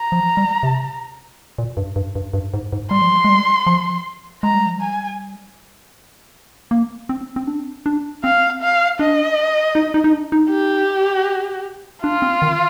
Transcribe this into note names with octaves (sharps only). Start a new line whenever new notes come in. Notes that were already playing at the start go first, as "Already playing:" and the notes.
Already playing: A#5
F3
G3
C3
A#2
G2
G2
G2
G2
G#2
G#2
G3 C6
F3
G3
G#3
G3
F3
G#3 A#5
G3
F3
G3 G#5
A#3
C4
C4
D4
D4
C4 F5
F5
D4 D#5
D#4
D#4
D#4
D4
D#4
G4
D4 F4
C4
D#3